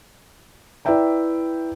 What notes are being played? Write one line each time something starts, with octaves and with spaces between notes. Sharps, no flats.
E4 B4 D5 E5 G5 A#5